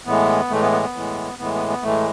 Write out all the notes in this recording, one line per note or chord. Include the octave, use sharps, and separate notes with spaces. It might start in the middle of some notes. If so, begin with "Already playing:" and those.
A2 E3 G#3 B3
A2 E3 G#3 A3
B3
B3
B3
A2 E3 G#3
A2 E3 G#3 B3
B3
B3
A2 E3 G#3 A3